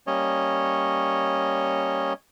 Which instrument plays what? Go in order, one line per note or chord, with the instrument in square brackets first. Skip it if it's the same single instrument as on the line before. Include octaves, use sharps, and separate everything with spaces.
[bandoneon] G3 A#3 C#4 C#5 D#5